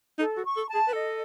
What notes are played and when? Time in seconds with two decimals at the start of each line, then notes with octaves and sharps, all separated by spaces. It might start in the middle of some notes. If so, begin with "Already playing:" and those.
0.19 D#4 A4
0.37 F#4
0.44 C#6
0.57 A4
0.68 A5
0.74 G#4
0.88 B4
0.93 A4 D#5